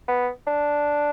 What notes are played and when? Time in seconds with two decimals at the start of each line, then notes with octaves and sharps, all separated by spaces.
0.08 B3
0.47 D4